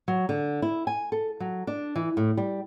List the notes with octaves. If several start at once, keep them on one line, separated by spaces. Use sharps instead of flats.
F#3
D3
E4
G#5
A4
F#3
D4
E3
A2
G3